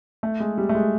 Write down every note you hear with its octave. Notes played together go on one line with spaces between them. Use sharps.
A3
G#3
G3
A3
G#3